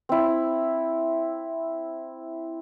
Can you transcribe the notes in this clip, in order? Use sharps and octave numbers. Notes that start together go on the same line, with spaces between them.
C4 E4